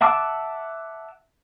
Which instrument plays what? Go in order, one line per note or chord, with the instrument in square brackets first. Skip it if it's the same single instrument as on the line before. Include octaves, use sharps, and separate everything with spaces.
[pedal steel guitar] E5 F#5 A5 D6 E6